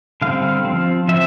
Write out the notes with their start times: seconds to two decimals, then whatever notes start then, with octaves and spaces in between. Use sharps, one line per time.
0.22 D3 G3 C4 F5
0.65 F3 C4
1.08 F3 C4 E5